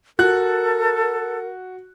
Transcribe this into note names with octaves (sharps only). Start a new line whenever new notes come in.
F#4 A4 A#4 F#6